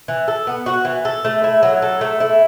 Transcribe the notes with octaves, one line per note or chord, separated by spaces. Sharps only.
E3
A4
B3
F#4
E3
A4
A3
E4
F#3
A4
A3
E4